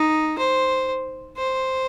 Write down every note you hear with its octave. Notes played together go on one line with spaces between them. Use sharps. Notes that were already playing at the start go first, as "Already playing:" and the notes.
Already playing: D#4
C5
C5